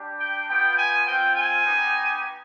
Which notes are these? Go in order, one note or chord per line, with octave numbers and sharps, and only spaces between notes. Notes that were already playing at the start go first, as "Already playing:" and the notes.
Already playing: G3 D4 G4
G5
B3 F4 G5
G#5
C4 F4 G5
G#5
B3 D#4 G4